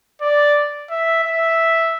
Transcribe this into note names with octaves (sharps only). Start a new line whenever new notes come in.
D5
E5
E5